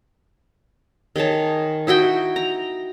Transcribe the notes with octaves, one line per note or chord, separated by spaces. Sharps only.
D#3 G#4 C#5 A5
D#4 E4 F#4 G5
A#5